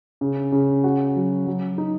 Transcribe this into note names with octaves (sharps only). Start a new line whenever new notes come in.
C#3
C#3
F#4
F#3
F#3
D#4